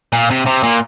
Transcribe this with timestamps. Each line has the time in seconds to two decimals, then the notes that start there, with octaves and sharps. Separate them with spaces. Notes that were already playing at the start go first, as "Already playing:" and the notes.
0.13 A#2
0.30 C3
0.46 C3
0.63 A#2